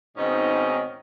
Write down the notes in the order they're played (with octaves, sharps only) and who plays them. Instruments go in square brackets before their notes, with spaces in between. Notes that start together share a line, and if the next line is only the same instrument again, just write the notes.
[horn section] G#2 B2 D#3 C4 C#4 D#5